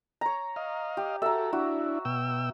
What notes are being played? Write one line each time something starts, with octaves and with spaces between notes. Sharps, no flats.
C#5 A#5
D#5 F5
G4
F#4 A4 E5 A#5
D4 E4 F#4
B2 G5 E6